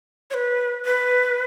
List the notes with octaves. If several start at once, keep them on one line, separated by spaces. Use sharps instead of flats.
C#5
B4
B4